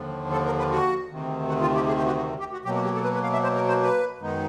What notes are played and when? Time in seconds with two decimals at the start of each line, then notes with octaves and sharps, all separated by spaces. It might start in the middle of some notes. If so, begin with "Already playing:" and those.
Already playing: D#2 D3 F3
0.32 A4
0.46 A#4
0.58 B4
0.71 F#4
1.09 D2 C3 D#3
1.49 F#4
1.61 F4
1.75 G4
1.87 G#4
1.97 G4
2.07 F#4
2.17 F#4
2.39 G4
2.53 F#4
2.65 B2 F#3 A#3 G4
2.75 F#4
2.84 G4
2.94 A4
3.03 B4
3.14 B4
3.23 F5
3.33 E5
3.43 C5
3.55 A#4
3.68 C5
3.82 B4
4.20 F#2 D#3 G#3 B3 D#4